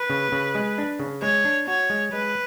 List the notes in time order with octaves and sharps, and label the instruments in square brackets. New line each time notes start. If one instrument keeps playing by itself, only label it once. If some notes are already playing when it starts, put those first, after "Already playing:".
Already playing: [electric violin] B4
[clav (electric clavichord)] C#3
C#3
G#3
D4
C#3
[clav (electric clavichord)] G#3 [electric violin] C#5
[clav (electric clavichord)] D4
[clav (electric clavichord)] F#4 [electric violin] C#5
[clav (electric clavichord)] G#3
[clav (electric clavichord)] G#3 [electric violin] B4